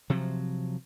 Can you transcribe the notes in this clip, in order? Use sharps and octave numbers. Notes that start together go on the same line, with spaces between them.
C3 F3 F#3